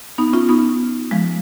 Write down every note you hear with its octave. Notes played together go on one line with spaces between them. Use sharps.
B3 D#4
C#4 F4
B3 D#4
F3 G#3